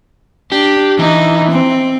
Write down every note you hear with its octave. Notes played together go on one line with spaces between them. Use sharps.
D4 G4
E3 D#4
C4